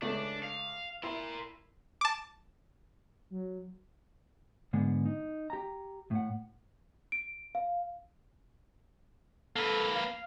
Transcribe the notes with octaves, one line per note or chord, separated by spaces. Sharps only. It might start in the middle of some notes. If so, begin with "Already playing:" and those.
C#2 A3 D4
F5
E4 A#4 C6
A5 D6
F#3
G#2 D3 G#3 B3
D#4
G4 A#5
A2 F#5
D7
F5
A#3 A4 B4
F5